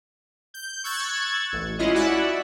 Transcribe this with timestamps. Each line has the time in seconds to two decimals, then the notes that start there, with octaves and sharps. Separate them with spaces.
0.54 G6
0.84 C#6 E6 F#6 G#6 A6
1.53 A1
1.79 G#3 C#4 E4 F4 D#5
1.93 E4 F#4 D5 E5 F#5